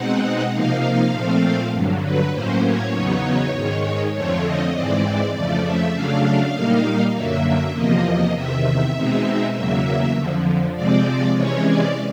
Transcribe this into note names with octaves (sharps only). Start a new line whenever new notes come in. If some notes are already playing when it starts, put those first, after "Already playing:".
Already playing: B2 G#3 C4 D#4 F#5
C3 F3 A#3 D#4 F5
A#2 F3 A3 C4
G2 D3 F#3
B4
A2 F#3 A#3 C#4 C5
C#5
E2 C#3 F#3 B3 D#4
G#2 D#3 G#3
F2 D3 F3 A3 C4 C#5
D#5
G#2 E3 G#3 C4 D5
F2 C#3 F3 A3 D5
E5
C#3 F#3 A3 D4 F5
A#2 G3 A#3 D#4
F#2 D3 F#3 A#3 E5
E2 C3 F3 A#3 D#5
E2 C3 D#3 E5
B2 G#3 C4 D#4
E2 C#3 F#3 A#3 E5
F2 D3 F3
C3 F3 G#3 C4 D5
C3 E3 G#3 C#4 C#5
D5